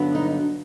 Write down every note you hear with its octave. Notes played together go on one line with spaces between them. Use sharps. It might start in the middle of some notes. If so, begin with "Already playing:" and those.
Already playing: G2 D3 F#3 B3 D4
D#4